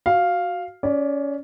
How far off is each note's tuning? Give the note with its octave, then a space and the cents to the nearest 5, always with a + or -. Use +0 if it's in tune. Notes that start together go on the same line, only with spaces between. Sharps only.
F#4 +0 F5 +0
C#4 +20 D5 +0